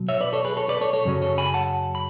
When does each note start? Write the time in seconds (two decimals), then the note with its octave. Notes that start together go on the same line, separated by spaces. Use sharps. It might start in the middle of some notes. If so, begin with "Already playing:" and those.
Already playing: B2 F#3
0.09 C#5 E5
0.21 B4 D5
0.33 A4 C#5
0.45 G#4 B4
0.57 A4 C#5
0.69 B4 D5
0.81 A4 C#5
0.93 A4 C#5
1.05 F#2 C#3 F#3 C#4
1.22 A4 C#5
1.38 G#5 B5
1.54 F#5 A5
1.95 B5